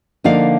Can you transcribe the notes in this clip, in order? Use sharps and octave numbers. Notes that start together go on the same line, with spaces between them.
D3 F3 A#3 D#4 D5 F5